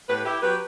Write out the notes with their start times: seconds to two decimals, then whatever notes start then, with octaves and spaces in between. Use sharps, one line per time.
0.08 A2 G4 B4
0.25 E4 G4
0.42 F#3 G4 B4